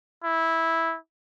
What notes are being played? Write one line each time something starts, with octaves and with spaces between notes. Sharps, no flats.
E4